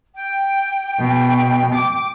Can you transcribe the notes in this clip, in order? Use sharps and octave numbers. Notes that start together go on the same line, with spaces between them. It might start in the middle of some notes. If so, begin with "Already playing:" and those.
G5
B2
D6